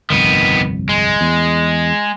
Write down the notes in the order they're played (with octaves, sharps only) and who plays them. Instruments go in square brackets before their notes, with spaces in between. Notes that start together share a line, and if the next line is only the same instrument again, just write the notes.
[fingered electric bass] G1 C2 F2 [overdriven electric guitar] D#3 B3
[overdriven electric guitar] G#3
[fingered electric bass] E2